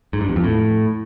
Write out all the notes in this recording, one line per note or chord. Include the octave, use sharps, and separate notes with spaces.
G#2
G2
E2
F2
A2